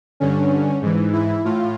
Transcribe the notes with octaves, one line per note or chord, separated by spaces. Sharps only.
G2 D3 C#4
G#2 E3
E4
A2 F4